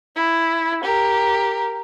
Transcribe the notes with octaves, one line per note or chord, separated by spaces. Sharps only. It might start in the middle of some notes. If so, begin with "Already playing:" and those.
E4
G4 A#4